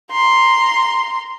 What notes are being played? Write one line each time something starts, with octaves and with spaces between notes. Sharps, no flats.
A#5 C6